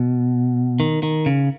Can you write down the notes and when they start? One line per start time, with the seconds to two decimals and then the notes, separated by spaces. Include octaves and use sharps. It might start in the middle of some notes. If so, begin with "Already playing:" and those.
Already playing: B2
0.80 D#3
1.03 D#3
1.26 C#3